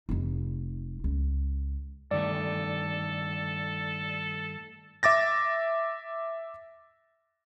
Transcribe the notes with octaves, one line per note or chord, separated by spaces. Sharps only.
F1 D#4
C#2
G2 D#3 A3 A4 D5
E5 D6 A6 A#6